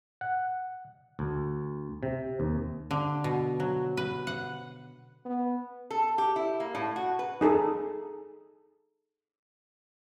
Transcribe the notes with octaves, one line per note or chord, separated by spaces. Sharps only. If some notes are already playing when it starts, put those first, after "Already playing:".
F#5
D2
C3
D#2
D3
B2
F#3
B4
F#5
B3
A4
G4
E4
A#3
A2
F#4
B4
D#4 G#4 A4